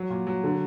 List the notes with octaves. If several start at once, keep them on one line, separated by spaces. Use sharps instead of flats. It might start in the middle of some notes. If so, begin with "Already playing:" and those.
Already playing: F#3
A#2
F#3
D3